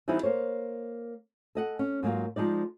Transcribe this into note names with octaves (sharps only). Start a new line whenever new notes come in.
E3 G3 B3 D#4 E4 C5
A#3 C5 C#5
A4 D#5 F#5
C#4
G#2 F#3 A#3 F4
F3 G#3 D#4 D5